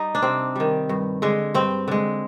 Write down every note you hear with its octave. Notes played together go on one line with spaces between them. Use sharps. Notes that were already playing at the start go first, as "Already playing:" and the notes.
Already playing: G3 D#4
D4
C3 C4
D#3 G3
G2
D3 G#3
G2 C4
D3 G#3